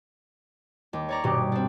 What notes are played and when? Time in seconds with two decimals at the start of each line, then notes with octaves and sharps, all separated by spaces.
0.93 D#2
1.09 C#5 D5 A#5
1.24 D#1 G2 B2 G4
1.52 C4 D4